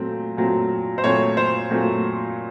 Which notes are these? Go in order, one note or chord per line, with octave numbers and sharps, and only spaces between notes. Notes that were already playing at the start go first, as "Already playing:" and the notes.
Already playing: A#2 F#3 A3 C4
A#2 F#3 A3 C4
C5
A#2 F#3 A3 C4 C#5
C5
A#2 F#3 A3 C4